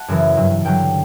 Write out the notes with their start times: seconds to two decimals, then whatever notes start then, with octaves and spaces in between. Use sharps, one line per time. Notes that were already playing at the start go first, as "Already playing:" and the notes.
Already playing: F#5 A5
0.08 F#2 C#3 E3
0.37 G2 F#3
0.65 G2 D3 F#3 G5